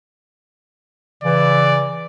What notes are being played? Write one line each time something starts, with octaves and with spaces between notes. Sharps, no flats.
C#3 E3 D5